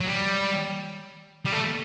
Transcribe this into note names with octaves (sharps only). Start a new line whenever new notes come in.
F#3
G3
G3
A3